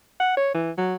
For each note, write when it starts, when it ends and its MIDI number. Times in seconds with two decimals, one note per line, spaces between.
0.20 0.35 78
0.37 0.52 73
0.54 0.71 52
0.78 0.95 54